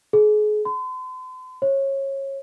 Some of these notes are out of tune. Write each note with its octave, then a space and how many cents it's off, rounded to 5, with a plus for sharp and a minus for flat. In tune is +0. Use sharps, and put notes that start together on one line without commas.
G#4 +35
C6 -45
C#5 -25